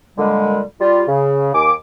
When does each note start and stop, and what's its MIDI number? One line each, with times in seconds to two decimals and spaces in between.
0.17 0.60 46
0.17 0.60 50
0.17 0.60 55
0.17 0.60 56
0.80 1.02 55
0.80 1.02 65
1.08 1.50 49
1.54 1.72 39
1.54 1.72 80
1.54 1.72 86